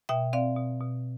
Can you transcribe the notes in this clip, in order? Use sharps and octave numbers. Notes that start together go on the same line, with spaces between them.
B2 E5 G5
C4 D5 F5
B2
B2